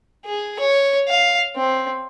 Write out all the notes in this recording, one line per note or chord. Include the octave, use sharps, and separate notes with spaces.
G#4
C#5
F5
C4